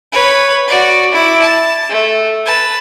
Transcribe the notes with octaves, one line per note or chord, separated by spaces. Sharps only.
B4 C#5
F#4 D5
E4 D6
A5
A3
B4 A5